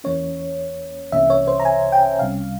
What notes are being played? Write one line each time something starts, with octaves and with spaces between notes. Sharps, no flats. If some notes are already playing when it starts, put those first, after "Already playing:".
E2 E3 A#3 C#4 C#5
C2 C3 E3 A#3 C#4 E5
C#5
C5
A#5
G#5
G5
C2 C3 G3 C#4 F5